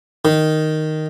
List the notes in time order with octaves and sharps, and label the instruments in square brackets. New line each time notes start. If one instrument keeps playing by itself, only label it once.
[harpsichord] D#3